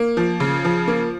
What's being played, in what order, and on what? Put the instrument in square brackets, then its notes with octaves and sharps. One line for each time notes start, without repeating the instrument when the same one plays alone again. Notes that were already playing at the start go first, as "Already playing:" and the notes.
Already playing: [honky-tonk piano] A#3
F3
C#3
F3
A#3